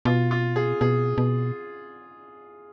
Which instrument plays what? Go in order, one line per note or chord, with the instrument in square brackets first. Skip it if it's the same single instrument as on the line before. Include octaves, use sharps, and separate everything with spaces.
[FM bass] B2 [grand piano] F4
[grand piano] F4
G#4
[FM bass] B2 [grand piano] G#4
[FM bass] B2